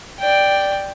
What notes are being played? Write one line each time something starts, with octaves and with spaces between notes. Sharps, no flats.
D5 G5